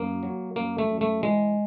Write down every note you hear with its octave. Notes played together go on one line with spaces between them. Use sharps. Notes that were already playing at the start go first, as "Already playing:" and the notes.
Already playing: F#2 A#3
F#3
F#2 A#3
A3
F#2
A3
E3 G#3